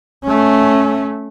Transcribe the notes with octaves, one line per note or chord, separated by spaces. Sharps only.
A3 C#4